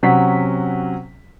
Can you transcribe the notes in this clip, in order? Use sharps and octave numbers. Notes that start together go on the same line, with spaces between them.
C3 F#3 C#4 F#4 F#5 B6